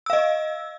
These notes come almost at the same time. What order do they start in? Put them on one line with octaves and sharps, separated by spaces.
E6 F5 D#5